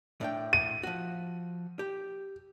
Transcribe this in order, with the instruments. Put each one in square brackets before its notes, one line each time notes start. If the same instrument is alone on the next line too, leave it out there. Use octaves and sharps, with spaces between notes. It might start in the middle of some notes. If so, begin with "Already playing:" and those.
[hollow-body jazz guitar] A2 D4 G5
[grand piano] D#7
[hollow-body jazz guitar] F3 F#4
G4